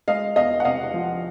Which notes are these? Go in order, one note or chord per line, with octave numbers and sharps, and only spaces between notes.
G#3 D#5 F5
E2 D#5 F5
F#5
C3 D#5 F5
F3